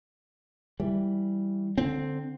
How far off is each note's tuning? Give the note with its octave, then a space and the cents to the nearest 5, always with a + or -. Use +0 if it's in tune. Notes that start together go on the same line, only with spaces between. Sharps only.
E3 +0 G3 +0
D3 +0 C4 +0